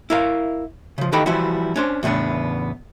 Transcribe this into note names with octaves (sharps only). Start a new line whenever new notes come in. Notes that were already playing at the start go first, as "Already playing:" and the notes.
E4 A#4 F5
C#3 F3
D#3 E3 D#4 G4 A4 B5
E3 F3 G3 E4 F#4
C#4 D4 C5
E2 A2 C#3 B3 D4